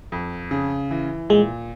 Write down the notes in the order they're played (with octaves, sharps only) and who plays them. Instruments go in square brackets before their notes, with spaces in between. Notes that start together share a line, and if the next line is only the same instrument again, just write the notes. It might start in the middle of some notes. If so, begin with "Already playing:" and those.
[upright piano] F2
C#3
E3
[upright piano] A#2 [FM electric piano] G#3